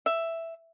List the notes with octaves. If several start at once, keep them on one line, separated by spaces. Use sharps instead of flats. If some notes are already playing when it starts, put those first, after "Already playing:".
E5